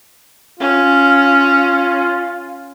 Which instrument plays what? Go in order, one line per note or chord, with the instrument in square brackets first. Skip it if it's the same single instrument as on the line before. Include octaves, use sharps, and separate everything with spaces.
[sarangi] C#4 [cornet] F4